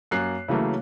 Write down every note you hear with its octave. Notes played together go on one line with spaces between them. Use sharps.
F#2 A#3 F#6 C7
C#3 E3 F#3 A3 A#3